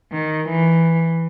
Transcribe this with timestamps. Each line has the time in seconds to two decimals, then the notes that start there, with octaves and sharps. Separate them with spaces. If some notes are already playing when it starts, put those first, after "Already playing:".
0.12 D#3
0.49 E3